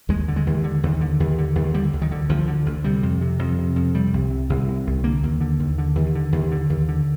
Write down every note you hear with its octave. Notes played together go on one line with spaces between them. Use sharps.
D#2 G#3
D3
G#3
D#2
D3
D#2
D3
D#2
D3
D#2
D3 G3
D2
D#3
D3
D2 F3
D3
D2
C3 G3
F2
C3
F2
C3
F2
C3 G3
C2
C3
C2
C3
C2
D3 A#3
D#2
D3
D#2
D3
D#2
D3
D#2
D3
D#2
D3